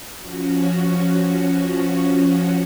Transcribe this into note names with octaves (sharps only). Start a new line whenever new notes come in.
F3 C#4 F#4